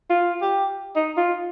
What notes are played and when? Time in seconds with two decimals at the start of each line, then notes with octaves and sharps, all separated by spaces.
0.10 F4
0.42 G4
0.96 D#4
1.17 F4